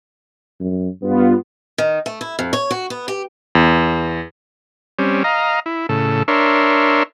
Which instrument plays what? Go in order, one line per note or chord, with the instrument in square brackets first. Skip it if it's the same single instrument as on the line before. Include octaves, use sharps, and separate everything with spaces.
[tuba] F#2
[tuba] G2 [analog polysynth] B3 F4
[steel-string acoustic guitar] D#3
A3
E4
F2
C#5
F#4
B3
G4
[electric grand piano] E2
[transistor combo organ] G3 C4 C#4
D#5 F5 A#5
E4
A2 C#3 A4
D4 A#4 C#5 E5 C6